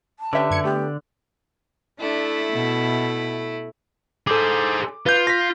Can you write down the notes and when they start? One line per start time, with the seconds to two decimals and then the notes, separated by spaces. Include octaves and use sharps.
0.20 A5
0.33 D3 C#4 G4 B4 E5
0.51 F#2 G#6 C#7
0.64 A3 B3 G4
2.00 A3 D4 E4
2.52 B2
4.27 G#4 A4 C5 D6
5.06 F4 B4 G6
5.27 A#6 B6